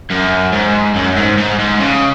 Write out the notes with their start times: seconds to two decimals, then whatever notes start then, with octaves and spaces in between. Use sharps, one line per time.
0.10 F#2
0.53 G#2
0.95 F#2
1.16 G#2
1.37 G#2
1.59 G#2
1.80 C#3